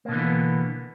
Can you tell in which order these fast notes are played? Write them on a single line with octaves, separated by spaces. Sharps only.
A#3 B2 D3 E3 B3